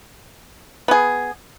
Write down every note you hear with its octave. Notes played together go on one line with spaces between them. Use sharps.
B3 G#4